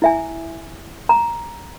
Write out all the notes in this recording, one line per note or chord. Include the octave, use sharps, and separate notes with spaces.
E4 E5 G#5
A#5